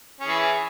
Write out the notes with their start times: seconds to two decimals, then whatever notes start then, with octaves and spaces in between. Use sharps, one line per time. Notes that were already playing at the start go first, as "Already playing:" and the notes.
0.20 C#4
0.24 G#4
0.27 E3